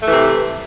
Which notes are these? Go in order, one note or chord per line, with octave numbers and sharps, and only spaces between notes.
C3 E3 A3